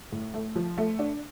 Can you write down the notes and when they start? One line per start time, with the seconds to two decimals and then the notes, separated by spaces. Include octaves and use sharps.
0.12 A2
0.34 A3
0.56 F3
0.78 A3
0.99 D4